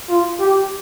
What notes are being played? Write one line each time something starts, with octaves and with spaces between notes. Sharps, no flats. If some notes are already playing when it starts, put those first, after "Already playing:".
F4
G4